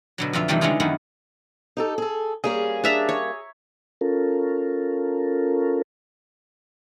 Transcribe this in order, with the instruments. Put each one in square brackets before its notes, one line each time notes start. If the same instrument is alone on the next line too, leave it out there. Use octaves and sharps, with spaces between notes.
[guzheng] B2 D3 F#3
F2 D3 F4 E5
C3 D#3 E3 G3 A3 C4
D3 G#3 C#4 E4 F4 G#4
F#2 D3 D#3 B3 E4 F#4
[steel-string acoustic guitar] D#4 G4 A4
G#4 A4
[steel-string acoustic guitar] G3 A#3 C#4 [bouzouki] G#4
[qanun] D4 E5 A#5
C#5
[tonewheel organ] C#4 F4 A4 A#4